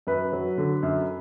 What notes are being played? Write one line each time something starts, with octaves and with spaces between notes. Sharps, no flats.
F#2 B4
F#3
D3
F#2